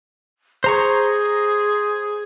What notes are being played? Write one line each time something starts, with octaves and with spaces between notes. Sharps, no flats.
G#4 C5 A#5 C#6